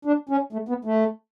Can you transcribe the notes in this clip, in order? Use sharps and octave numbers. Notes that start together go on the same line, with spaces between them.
D4
C#4
A3
B3
A3